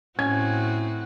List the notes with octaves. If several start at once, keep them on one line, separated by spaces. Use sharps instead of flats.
A2 C4 C#4 F#4 G#6